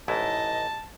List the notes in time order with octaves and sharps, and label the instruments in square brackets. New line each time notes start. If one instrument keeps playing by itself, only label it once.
[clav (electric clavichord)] A1 G#2 E4 [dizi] D#5 [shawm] A5